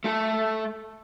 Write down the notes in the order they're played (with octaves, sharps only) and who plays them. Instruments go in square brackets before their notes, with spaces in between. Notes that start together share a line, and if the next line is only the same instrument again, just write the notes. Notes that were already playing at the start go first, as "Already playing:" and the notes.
[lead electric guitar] A3 A4